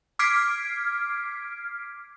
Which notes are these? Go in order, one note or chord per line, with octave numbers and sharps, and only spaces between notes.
D6 F6 G#6 B6 C7 D7